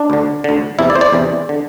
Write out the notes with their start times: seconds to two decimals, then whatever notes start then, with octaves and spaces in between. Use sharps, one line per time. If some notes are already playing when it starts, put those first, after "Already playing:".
Already playing: D4
0.10 D2 D3
0.44 D2 D3
0.79 E2 C3 E3 E4
0.90 D5
0.95 C5
1.01 D5
1.12 E2 C3 E3
1.49 D3